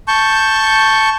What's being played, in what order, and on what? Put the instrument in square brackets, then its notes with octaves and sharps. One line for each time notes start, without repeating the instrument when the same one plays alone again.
[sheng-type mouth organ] A5 C#6 G6